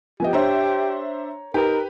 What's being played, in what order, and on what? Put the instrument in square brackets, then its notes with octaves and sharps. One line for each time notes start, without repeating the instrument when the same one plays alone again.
[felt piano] F3 B3 D#5 [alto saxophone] G4 [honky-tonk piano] G#5
[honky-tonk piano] D4 C5 E5 [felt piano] C#5 A#5
[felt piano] D#4 [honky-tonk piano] G4 B4 [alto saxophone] A#4